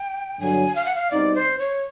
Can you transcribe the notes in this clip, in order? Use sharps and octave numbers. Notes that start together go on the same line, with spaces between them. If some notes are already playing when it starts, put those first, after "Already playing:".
Already playing: G5
G2 D3 F#3 G#5
F5
F#5
F5
B2 G3 C4 D#4 D5
C5
C#5